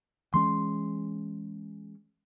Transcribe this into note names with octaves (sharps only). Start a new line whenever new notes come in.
E3 G#3 C#4 C6